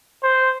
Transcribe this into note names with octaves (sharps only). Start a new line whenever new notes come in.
C5